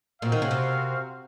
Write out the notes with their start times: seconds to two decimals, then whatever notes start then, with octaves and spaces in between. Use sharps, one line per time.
0.22 A#2 C4 F#4 A#4 F5
0.32 D#3
0.42 C#3
0.51 C3